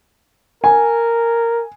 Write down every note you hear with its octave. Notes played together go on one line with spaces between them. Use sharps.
A#4 G#5